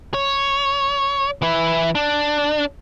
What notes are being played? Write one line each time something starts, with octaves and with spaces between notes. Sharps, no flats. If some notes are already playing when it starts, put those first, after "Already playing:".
C#5
E3 E4
D4